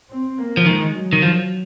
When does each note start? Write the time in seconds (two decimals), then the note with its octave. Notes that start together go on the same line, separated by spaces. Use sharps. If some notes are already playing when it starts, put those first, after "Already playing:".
0.10 C4
0.38 A#3
0.57 F3
0.66 D#3 G#3
0.94 F#3
1.13 D#3
1.22 F3